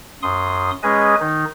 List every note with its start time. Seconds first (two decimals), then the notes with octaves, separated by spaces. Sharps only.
0.22 F#2 C6 D#6
0.83 G#3 C#4 G#4 B4 D#5 G#5
1.20 D#3 D#4